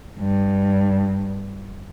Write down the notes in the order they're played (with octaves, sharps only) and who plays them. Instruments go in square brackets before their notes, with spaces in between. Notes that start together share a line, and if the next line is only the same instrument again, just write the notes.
[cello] G2